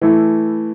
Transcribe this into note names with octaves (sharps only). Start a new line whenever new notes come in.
E3 A3 E4